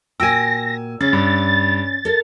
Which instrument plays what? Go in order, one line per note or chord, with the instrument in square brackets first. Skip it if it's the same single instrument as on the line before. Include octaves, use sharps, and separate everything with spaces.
[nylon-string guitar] A#2 F#4 G5 [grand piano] G#5 E6 [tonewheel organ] A#6
[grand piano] C#3 [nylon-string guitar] C#4 [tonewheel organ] A6
[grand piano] G2
[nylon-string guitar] A4 A#4